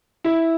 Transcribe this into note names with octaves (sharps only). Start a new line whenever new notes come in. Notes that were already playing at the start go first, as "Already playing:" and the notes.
E4